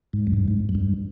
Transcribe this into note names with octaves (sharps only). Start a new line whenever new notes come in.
G#2
F#2
G2
G#2
F#2
G2